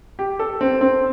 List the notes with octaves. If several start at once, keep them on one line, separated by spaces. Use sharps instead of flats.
G4
A4
C4
C4